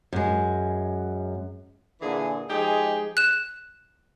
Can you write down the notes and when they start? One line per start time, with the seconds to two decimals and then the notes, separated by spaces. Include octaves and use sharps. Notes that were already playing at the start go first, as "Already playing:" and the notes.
0.13 F#2 G#3
2.01 A#2 D3 E3 G#4
2.50 F3 G#3 D#4 G4 G#4
3.17 F#6 E7